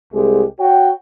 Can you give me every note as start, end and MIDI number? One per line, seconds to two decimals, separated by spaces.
0.14 0.44 36
0.14 0.44 56
0.14 0.44 67
0.14 0.44 68
0.60 0.91 66
0.60 0.91 73
0.60 0.91 79